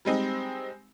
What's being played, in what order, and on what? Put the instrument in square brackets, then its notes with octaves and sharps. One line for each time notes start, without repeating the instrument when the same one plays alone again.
[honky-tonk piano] G3 G#3 C4 D#4